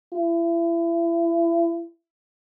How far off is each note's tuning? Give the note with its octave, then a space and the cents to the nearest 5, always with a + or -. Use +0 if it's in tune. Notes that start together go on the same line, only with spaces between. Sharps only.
E4 +35